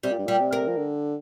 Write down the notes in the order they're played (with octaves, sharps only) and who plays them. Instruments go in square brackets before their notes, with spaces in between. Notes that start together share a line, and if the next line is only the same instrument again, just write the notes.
[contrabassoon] C3 [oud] G3
[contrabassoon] A#2
G2
[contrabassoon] A#2 [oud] G3
[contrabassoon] C3
[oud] A#4
[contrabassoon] F3
D3